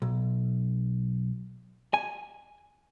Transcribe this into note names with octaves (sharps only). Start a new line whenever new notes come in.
B1
G#5